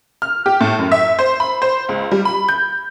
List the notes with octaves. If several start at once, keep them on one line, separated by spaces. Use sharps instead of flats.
F6
G4
A2
F#2
E5
C5
B5
C5
C#2
G3
B5
G6